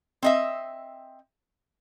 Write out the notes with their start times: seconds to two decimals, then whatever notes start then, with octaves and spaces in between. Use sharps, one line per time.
0.22 C4 D#5 E5